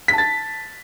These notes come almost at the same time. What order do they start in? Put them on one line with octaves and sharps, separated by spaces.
B6 A5 A6